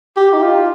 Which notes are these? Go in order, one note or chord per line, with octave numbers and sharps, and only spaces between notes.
G4
D#4
F4